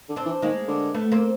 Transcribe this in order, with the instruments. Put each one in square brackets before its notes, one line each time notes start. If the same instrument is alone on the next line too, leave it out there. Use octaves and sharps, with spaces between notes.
[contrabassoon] D3
[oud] C4 D4
[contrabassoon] E3
[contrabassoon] D#3 [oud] G#3 A#3
[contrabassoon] D3
[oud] A3 B3
A#3 C4